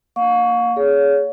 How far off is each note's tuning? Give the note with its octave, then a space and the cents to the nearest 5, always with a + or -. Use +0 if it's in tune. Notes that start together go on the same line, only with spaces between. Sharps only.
A#3 +0 F5 +40 C#6 +20
G#4 +10 C#5 +30